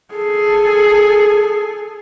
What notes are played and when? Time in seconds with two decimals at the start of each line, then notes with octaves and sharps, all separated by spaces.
0.14 G#4 A4